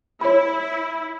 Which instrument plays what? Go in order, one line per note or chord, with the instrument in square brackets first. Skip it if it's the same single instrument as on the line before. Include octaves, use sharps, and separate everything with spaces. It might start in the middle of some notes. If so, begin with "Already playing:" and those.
[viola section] E4 [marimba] C#5 B5